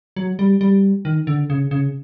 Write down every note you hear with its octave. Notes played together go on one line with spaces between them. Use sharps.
F#3
G3
G3
D#3
D3
C#3
C#3